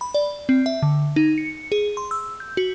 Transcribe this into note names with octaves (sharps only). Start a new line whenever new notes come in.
B5
D5
C4
E5
D3
D#4
C#7
G#4
C6
E6
G6
F#4